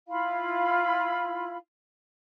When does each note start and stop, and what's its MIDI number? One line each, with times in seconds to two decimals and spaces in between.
0.08 1.56 64
0.08 1.56 65
0.08 1.56 77
0.08 1.56 83